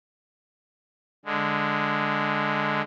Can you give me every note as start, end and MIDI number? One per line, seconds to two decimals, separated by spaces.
1.25 2.82 50
1.25 2.82 56